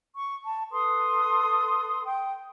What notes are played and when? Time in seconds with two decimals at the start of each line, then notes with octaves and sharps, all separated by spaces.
0.14 C#6
0.45 A5
0.72 A4 B4 C6 D#6
2.05 G5